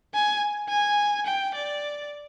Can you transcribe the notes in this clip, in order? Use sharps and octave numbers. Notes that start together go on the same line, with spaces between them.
G#5
G#5
G5
D5